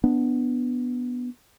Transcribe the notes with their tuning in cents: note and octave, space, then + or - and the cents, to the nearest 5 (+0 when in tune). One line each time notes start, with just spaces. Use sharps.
B3 +0 D4 +0